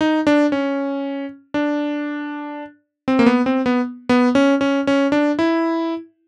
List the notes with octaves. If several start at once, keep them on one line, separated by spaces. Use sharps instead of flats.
D#4
D4
C#4
D4
C4
A#3
B3
C4
B3
B3
C#4
C#4
C#4
D4
E4